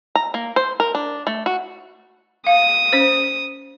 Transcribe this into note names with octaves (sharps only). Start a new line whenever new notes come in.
A#5
A#3
C5
A#4
D4
A3
F#4
F5 D#6
C#4 C5